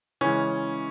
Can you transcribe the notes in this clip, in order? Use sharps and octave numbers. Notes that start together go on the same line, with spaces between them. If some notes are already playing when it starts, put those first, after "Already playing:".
C#3 E3 G#3 C#4